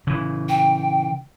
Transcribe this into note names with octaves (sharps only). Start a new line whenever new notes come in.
C#3 E3
G5